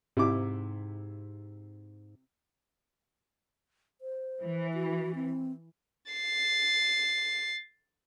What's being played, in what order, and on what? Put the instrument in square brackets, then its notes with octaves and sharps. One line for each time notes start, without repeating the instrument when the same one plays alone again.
[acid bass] G#2 [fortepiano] C3 E4 D6
[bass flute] C5
[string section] E3
[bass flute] F#4
C4
[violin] A6 C7